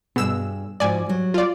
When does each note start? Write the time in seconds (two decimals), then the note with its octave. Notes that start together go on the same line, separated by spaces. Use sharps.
0.16 G2 B2 G#4 E6 E7
0.80 G#2 F3 F#4 D5 G#5
1.06 F#3 G3
1.34 F4 D5